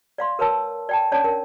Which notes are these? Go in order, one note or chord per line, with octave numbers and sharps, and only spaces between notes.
D5 F5 C6
A#4 B4 C#5 A5 E6
D5 G5 A5
C#4 D4 C#5 D5 A5
A#4